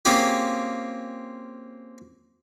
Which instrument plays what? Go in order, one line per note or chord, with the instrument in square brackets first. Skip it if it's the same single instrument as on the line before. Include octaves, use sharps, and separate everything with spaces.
[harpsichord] A#3 C4 C#4 F4 G4 G#4